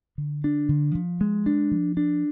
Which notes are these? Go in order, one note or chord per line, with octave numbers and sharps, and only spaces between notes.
D3
D4
D3
F3
G#3
D4
F3
D4